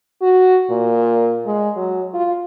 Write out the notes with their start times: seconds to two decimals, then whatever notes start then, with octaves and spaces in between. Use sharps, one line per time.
0.22 F#4
0.70 A#2
1.46 G#3
1.76 F#3
2.14 F4